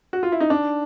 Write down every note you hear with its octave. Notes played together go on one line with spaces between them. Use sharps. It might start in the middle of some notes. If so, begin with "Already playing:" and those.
F#4
F4
E4
D#4
D4